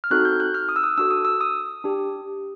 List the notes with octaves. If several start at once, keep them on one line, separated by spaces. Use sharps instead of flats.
F6
C4 D#4 F#4 A4 F#6
G6
F#6
F6
D#6
E6
D#6
D4 F#4 A4 E6
D#6
E6
D#6
D4 G4